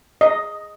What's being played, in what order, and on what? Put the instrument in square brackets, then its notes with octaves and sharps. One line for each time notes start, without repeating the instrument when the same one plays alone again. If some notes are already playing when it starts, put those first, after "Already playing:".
[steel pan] D#5